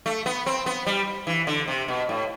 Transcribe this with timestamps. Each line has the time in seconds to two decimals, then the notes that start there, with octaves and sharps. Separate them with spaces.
0.06 A3
0.26 B3
0.46 C4
0.66 B3
0.86 G3
1.27 E3
1.47 D3
1.68 C3
1.88 B2
2.09 A2